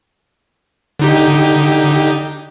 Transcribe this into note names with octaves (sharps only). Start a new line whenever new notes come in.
D3 D#4 G4